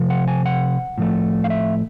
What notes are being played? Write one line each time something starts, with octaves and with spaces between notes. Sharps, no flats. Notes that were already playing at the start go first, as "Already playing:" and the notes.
Already playing: C3 F3
F#5
G#5
F#5
A2 F3 A3
F5
E5